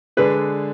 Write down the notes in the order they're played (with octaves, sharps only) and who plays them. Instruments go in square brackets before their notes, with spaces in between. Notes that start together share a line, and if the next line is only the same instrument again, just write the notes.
[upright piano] D3 G#3 D4 G#4 [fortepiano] B4